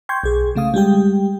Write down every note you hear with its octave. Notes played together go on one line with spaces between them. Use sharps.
G5 C6 C#6 G6 G#6
B1 G#4
C#3 A3 F5 D#6
G3 G#3 G4 G5